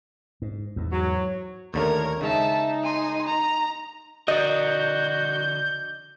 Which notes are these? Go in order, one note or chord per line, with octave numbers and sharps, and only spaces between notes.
G#2
E2 G#2
F#3
D#2 D3 A3 A#4 C#5 G#6
C#3 G#3 D#4 E5 A5
G#5 C6
A#5
D3 F#4 A#4 D5 D#5 G6